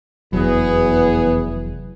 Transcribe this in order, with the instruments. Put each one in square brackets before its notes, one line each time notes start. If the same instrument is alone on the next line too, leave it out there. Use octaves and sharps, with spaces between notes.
[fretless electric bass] F1 F#3 [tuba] E2 [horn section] B3 G#4